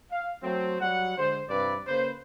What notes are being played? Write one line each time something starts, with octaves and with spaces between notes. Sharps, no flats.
F5
F#3 A3 C4
F#3 G3 F#5
D3 G#3 C5
G2 C3 E3 B4 D5
C#3 A#3 B4 C5